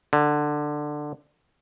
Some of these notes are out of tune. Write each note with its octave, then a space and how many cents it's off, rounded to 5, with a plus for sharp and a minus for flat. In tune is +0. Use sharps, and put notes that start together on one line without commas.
D3 +15